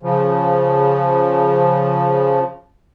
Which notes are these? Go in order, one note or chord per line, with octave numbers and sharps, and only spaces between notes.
C#3 F3